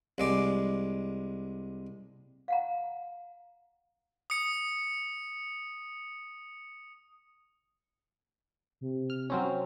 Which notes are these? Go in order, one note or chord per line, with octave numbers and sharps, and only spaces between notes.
C2 G#3 D5
F5 F#5 A#5
D#6 C#7
C3
F6
F#3 C4 C#4